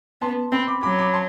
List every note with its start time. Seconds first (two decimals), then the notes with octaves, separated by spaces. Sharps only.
0.21 B3 A5 C6
0.52 C4 G5 B5
0.67 B5 D6
0.83 F#3 B5 D6
0.98 B5 D6
1.14 A5 C6